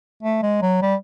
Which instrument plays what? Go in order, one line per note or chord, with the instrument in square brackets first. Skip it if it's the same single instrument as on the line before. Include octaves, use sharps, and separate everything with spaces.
[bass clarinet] A3
G#3
F#3
G3